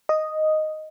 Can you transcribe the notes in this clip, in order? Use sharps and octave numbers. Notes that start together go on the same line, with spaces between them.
D#5